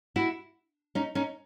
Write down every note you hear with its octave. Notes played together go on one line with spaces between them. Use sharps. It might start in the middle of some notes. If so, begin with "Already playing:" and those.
E4 F#4
C#4 D#4
C#4 D#4